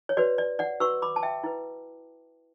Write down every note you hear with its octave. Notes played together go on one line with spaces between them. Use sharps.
C#5
F#4 B4 D5
D5
D5 F#5
F#4 B4 C#6 E6
B5 D6
A5
E5 G5
E4 B4